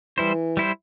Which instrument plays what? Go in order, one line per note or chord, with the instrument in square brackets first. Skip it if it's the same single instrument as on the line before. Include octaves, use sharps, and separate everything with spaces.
[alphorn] E3 [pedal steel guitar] G3 E4 C5
[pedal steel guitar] G3 E4 C5